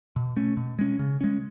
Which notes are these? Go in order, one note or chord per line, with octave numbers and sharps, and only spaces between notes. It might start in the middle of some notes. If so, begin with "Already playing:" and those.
B2
A3 C#4
B2
G#3 C#4
C#3
G#3 C#4